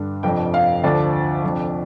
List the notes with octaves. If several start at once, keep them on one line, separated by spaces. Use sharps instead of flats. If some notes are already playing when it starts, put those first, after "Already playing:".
Already playing: G2 D3 D4
F1 F2 F3 D4 G5
F5
D2 D3 F3 D4 D5
F1 F2 F3 D4